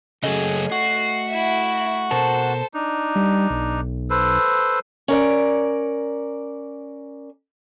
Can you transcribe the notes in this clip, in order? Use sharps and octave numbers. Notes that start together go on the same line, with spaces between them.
C#3 F#3 A3 G#4 A4 D#5
F#4 C7
E4 E5
B2 A4 A#4 C5 A5
D4 D#4
G3
B1
A4 B4 C5
C#4 A#4 D5